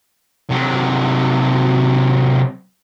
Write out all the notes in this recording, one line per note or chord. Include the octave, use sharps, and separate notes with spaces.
C3 F#3